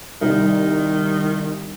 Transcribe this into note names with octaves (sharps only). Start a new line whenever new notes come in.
C2 D#3